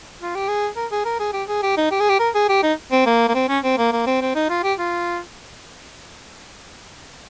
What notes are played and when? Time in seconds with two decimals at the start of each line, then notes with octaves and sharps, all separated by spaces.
0.22 F4
0.35 G4
0.48 G#4
0.76 A#4
0.91 G#4
1.05 A#4
1.20 G#4
1.33 G4
1.48 G#4
1.63 G4
1.78 D#4
1.91 G4
2.00 G#4
2.09 G4
2.20 A#4
2.35 G#4
2.49 G4
2.63 D#4
2.92 C4
3.06 A#3
3.29 A#3
3.35 C4
3.49 C#4
3.64 C4
3.78 A#3
3.92 A#3
4.07 C4
4.22 C4
4.35 D#4
4.50 F4
4.64 G4
4.79 F4